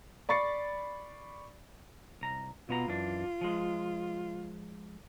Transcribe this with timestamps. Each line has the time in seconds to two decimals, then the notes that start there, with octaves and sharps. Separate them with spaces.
0.29 D5 B5 C#6 A6 C7 C#7
2.21 C2 A#5
2.69 B2 B3 F4 A#5
2.88 F#2 E3 D4
3.41 F3 G#3